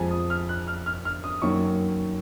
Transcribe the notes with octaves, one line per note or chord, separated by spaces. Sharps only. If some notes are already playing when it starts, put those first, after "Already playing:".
Already playing: F2 F3 G#3 G#5
D#6
F6
F#6
F6
F6
F6
D#6
F#2 D#3 F#3 A#3 C#6